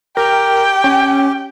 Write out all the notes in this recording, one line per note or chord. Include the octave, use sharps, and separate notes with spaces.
G4 A#4 G5
C#4